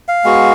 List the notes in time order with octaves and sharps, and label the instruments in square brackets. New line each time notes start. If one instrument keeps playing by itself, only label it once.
[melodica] F5
G#3 B3 F#4